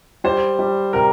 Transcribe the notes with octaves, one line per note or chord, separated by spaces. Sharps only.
G3 C5
G3
C3 A#4